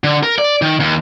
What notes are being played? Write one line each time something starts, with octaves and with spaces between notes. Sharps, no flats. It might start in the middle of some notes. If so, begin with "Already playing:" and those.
D3
A#4
D5
D#3
D#2